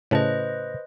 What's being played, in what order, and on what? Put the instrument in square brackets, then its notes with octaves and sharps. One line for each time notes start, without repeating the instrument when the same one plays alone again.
[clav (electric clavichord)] A2 C#3 A5 [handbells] B4 C5 D#5